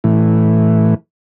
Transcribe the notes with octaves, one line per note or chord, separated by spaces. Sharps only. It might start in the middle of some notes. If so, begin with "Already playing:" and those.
A2 E3